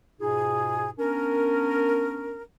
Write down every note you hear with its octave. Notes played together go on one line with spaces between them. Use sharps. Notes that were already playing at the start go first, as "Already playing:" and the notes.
G#2 B2 D#4 F4 G#4
B3 C#4 D4 A#4